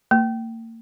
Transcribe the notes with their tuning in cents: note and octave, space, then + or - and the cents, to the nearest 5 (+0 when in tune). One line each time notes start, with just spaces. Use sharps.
A#3 -40